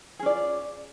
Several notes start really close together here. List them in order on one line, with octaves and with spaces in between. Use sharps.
G#4 C#4 D5 F4